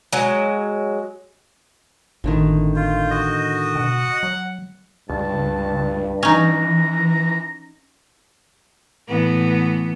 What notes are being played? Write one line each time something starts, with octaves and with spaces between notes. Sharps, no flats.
F#3 G#3
G#1 A2 D3 D#3
F4 G6
F#4 D#5
B2 F#5
F#3
C#2 G2 A5
E3 C#4 D#4 A#5
A2 E3 B3